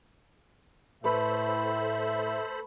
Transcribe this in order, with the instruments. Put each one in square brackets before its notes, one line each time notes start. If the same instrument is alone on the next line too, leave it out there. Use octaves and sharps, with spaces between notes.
[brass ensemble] A2 [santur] A3 B4 [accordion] A4 C5 B5 [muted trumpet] E5